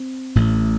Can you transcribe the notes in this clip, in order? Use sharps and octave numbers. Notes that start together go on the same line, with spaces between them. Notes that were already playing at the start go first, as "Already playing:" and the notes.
Already playing: C4
A1 A2